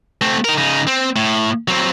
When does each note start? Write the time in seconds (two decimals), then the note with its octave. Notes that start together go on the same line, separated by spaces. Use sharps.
0.21 A3 C4
0.44 D#4 A#4
0.58 C#3 D#4
0.87 C4
1.16 A2
1.68 F#3 C4